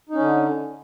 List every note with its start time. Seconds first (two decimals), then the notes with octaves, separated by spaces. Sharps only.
0.09 D#4
0.14 C#4
0.19 D3